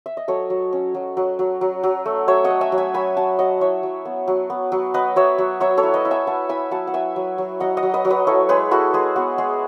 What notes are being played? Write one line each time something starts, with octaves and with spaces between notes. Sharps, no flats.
E5
D#5
F#3 A4 C#5
F#3
C#4
F#3
F#3
F#3
F#3
F#3
A3
F#3 C#5 E5
D#5 F#5
A3
E5 G#5
F#3
E5 G#5
F#3 G#5 B5
F#3 F#5 A5
F#3 D#5 F#5
E4 C#5 E5
F#3
B3
F#3
B3
F#3
B3 B4 D#5
F#3 C#5 E5
F#3
F#3 C#5 E5
A4 C#5
E4
B4 D#5
E4
E5 G#5
E4 F#5 A5
E4 G#5 B5
F#3 F#5 A5
F#5
F#3 E5 G#5
F#3
F#3
F#3 D#5 F#5
D#5 F#5
F#3
B4 D#5
F#3
B4 D#5
E4 A4 C#5
G#3 G#4 B4
E4 F#4 A4
G#3 G#4
B3 F#4
G#3 G#4